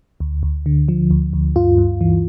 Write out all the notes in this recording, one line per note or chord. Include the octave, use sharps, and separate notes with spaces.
D2
D2
D3
F3
D2
D2
G2 F4
G2
E3